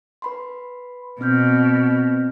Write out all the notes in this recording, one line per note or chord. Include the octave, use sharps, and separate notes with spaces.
B4 B5 C6
B2 C4 F6 G6